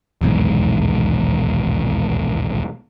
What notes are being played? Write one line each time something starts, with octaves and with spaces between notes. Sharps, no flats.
D#1 B1 E2 G#2